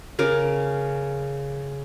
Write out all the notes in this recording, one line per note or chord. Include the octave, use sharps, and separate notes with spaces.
C#3 A#4 D6